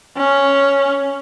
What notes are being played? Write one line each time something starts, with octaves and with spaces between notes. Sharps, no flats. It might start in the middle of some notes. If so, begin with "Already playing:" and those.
C#4